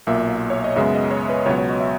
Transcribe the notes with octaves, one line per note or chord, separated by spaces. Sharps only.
B1 A#2 A#3 E5
C#5
D#5
F#2 C#3 G#3 B3 E5
D#5
C#5
B4
C#2 B2 F#3 B3 C#5
C#5
D#5
E5